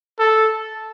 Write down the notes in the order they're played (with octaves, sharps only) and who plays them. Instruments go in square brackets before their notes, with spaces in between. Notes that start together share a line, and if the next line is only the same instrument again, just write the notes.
[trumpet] A4